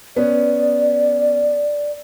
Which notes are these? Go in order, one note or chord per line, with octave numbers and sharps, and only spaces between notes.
B3 C#4 D5